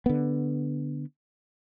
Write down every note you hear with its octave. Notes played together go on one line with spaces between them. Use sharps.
D3 B3